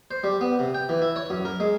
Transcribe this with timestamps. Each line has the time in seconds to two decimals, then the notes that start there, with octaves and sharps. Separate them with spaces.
0.11 C5
0.24 G3
0.41 B3
0.59 C3
0.74 G5
0.89 E3
1.02 E4
1.16 C#5
1.30 F#2
1.45 A#4
1.60 G#3